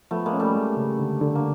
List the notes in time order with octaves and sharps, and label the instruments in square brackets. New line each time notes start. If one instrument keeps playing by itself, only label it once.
[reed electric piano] F3 [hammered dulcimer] A3 B3
[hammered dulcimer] G#3 A#3
[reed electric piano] C#4
[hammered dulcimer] G3 A3
[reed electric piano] G#3
C#3
D3
D3
[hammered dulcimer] A#3